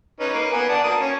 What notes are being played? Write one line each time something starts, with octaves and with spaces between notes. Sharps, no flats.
C#4 D#4 B4
A#3 B4
B3 G#5
D5 F#5 A5
A#3 A5 D#6
C#4